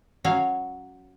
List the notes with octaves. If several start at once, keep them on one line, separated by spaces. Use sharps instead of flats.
F#3 C#4 F#4 C#5 F5